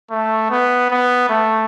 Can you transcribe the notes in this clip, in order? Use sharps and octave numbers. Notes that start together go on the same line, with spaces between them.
A3
B3
B3
A3